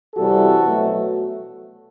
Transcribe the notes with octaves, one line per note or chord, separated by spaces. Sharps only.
C3 E3 G3 C4 F#4 A4
B2 F#3 A3